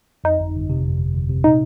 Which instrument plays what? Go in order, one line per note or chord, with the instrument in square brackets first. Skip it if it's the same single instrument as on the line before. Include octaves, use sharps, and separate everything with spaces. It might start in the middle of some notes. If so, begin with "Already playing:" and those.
[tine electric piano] F2 [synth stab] D#4
[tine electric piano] G1
G1
C3
F2
G1
G1
C3
[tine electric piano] A#2 [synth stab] D#4